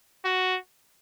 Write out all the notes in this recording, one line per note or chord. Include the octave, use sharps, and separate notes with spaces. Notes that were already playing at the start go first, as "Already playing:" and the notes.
F#4